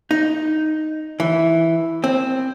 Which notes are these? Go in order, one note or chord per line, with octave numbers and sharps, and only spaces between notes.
D#4
E3
C4